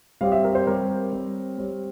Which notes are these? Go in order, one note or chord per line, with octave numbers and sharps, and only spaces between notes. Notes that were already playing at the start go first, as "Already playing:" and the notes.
G3 C4 G4 C#5 F5
E5
A#4
C5
G3 C4 G4 A#4 C#5
G3 C4 G4 C#5
G3 C4 G4 C#5